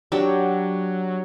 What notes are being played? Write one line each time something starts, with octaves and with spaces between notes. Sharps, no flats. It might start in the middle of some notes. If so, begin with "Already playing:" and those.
F#3 D4 G4